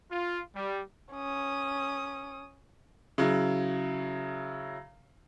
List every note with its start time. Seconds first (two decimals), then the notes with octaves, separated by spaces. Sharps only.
0.11 F4
0.55 G3
1.13 C#4 D#6
3.18 C#3 F#3 E4